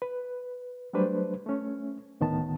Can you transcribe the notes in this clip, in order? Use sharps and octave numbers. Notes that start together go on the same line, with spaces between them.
B4
F#3 G3 A3 D4 B4 C5
A3 C#4
D2 A2 D#3 B3 A5